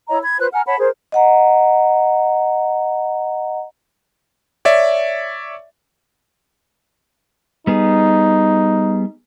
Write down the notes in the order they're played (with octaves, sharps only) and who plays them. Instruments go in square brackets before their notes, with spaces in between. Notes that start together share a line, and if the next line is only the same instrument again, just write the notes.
[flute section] E4 C#5 D#5 A#5
B5 G#6
F4 B4 C5 F#6
F#5 G#5 A#5 F6
C#5 F#5 A5 B5
G#4 A#4 C5
[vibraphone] D#5 F#5 A#5
[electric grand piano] C#5 D5 E5
[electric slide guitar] G3 B3 G#4 [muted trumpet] D#4